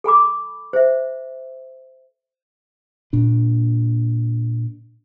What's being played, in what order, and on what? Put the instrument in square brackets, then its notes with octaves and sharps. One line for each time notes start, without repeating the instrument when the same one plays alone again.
[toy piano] A4 G#5 B5 D6
C5 E5
[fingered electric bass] A#2 D4